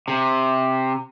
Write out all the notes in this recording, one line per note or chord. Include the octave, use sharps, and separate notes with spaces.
C3